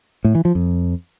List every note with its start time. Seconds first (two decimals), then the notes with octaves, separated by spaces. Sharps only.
0.24 A2
0.35 E3
0.45 F3
0.55 F2